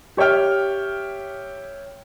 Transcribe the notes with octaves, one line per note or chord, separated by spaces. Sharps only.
G4 C#5 E5 G5 F6